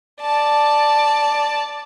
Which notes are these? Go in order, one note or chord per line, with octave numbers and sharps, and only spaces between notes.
D5 A5